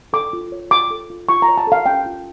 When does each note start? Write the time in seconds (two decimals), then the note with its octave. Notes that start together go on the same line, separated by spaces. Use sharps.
0.13 A4 D6
0.33 F4
0.52 C#5
0.71 F4 D6
0.91 A4
1.10 F4
1.29 F4 C#6
1.42 A#5
1.48 C#5
1.57 A5
1.67 A4 F5
1.86 C#4 G5
2.06 F4